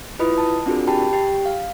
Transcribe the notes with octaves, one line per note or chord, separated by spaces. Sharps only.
E4 F4 B4 D#5 B5 D#6
A5
C4 D4 F4 F#4 G#4 A#4
G4 G5 A5 B5
G4 G5
F5